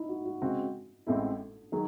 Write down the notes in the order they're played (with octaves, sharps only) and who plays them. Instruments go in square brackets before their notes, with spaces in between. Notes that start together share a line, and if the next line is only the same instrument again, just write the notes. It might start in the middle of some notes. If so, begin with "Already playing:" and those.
Already playing: [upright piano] D#4 E4
F#4
F#4
[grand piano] C#3 G#3 C4 F#4
[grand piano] A1 A2 G#3 C4 E4 [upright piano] A4
[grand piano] D#3 F#3 [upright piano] G#4